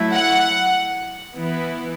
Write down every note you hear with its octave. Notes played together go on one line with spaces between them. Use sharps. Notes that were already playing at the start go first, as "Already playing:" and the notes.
Already playing: F#3 A3 E4
F#5
E3 B3 E4